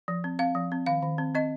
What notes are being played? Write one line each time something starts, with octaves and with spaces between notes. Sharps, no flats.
F3
C4
C4 F5
F3
C4
D#3 F5
D#3
C4
C4 D#5